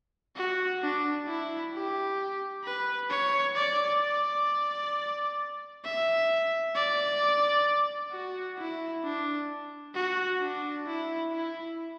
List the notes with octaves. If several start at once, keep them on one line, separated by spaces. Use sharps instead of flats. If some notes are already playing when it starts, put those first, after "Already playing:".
F#4
D4
E4
G4
B4
C#5
D5
D5
E5
D5
F#4
E4
D4
F#4
D4
E4
E4